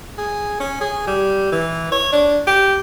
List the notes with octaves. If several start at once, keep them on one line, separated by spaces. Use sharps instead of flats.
G#4
C#4
G#4
G3
E3
C#5
D4
G4